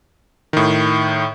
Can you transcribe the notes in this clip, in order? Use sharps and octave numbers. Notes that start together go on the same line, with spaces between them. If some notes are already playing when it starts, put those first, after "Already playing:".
A2 D#3